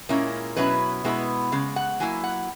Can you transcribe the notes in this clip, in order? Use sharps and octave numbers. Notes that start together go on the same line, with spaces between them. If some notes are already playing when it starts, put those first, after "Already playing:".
A#2 G#3 C#4 E4 A#4
B2 F#3 C#4 E4 B4
B2 G#3 B3 E4
C#3 G#3
F#5
F#3 A#3 E4 G#5
F#5